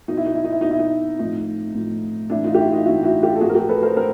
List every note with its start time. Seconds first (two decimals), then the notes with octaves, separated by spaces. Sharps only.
0.08 B2 D#4
0.17 E4
0.26 D#4
0.35 E4
0.44 D#4
0.52 E4
0.61 B2 D#4
0.71 E4
0.79 D#4
1.19 A2 F3 D#4
1.75 A2 F3
2.30 A2 E3 D4 E4
2.44 D#4 F4
2.54 G4
2.58 E4 F#4
2.72 D#4 F4
2.86 A2 E3 E4 F#4
3.03 E4 F#4
3.22 F4 G4
3.36 A4
3.41 A2 F3 F#4 G#4
3.50 A#4
3.54 G4 A4
3.69 A4 B4
3.82 A#4 C5
3.96 A2 A#4 C5